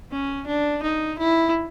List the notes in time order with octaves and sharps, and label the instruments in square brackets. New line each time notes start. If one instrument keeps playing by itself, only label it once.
[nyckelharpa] C#4
D4
D#4
E4